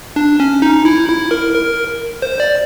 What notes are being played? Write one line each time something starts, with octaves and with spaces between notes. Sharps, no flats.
D4
C#4
D#4
E4
E4
A#4
A#4
C5
D5